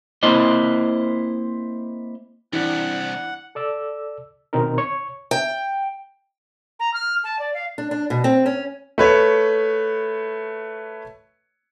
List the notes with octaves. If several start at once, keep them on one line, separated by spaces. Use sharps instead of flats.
A#3 C4 E4 C5 D#5
C2 E3 D4 F#5
A4 D5 E6
B2 D#3 C4 C#4 D#4 A#4
C#5 C#6
G5
A#5
F6
A5
D5
F5
D4
D4
B2
C4
C#4
A3 B4 C#5